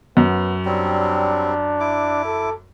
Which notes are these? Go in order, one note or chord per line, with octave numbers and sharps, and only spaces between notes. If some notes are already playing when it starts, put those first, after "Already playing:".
F#2 B3
F#3 G3 C4 D4
E4 D6
A4